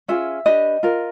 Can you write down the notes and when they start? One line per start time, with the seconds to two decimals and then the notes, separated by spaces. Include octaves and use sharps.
0.08 C#4 F4 G#4 E5
0.46 D4 G4 B4 D#5
0.83 F4 A#4